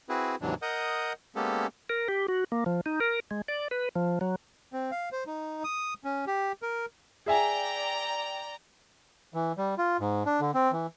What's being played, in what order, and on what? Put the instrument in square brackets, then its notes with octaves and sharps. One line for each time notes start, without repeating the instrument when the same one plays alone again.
[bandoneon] C4 E4 F#4 G#4 B4
D#2 G#2 C3 E3 F#3 D4
A#4 D#5 F#5 D#6 G6
G#3 A#3 B3 C#4 G4 A4
[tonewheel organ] A#4
G4
F#4
A#3
F3
D#4
A#4
G#3
D5
B4
F3
F#3
[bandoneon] C4
F5
C5
D#4
D#6
C#4
G4
A#4
[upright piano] G#4 E5 G#5 [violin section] D5 G5 A#5
[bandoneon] E3
G3
F4
G#2
D4
D3
C4
E3